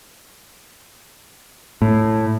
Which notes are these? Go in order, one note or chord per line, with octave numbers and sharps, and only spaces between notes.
A2